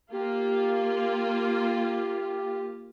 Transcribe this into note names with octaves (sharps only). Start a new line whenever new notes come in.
A#3 F4 G4